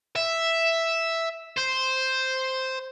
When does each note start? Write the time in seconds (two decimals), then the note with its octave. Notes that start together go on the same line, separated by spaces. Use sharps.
0.16 E5
1.57 C5